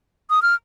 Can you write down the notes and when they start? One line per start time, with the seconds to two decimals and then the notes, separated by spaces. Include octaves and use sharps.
0.30 D#6
0.42 F6